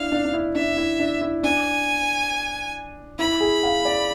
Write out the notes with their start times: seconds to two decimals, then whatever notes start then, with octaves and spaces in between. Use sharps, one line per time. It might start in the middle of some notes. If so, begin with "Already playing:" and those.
Already playing: D4 E4 F5
0.12 D4
0.25 D4
0.33 E4
0.55 D4 E5
0.77 E4
0.99 D4
1.21 E4
1.43 D4 G#5
3.19 E4 B5
3.40 G#4
3.63 F5
3.85 D5